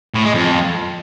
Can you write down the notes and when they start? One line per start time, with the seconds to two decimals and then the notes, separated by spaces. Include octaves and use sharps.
0.14 A2
0.24 G#3
0.34 F2